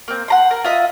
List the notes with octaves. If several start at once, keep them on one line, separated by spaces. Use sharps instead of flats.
A#3 C4
F#5 A#5 C6
A#4
F4 D#5 E5